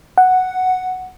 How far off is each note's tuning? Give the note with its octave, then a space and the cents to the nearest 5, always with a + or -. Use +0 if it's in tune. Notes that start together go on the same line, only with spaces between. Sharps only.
F#5 +0